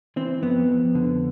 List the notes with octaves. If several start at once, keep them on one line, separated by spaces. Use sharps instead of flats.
E3 C4
F2 B3
F2
D3